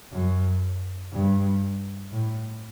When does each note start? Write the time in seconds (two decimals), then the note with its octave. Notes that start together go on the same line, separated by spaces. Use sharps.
0.12 F#2
1.12 G2
2.12 A2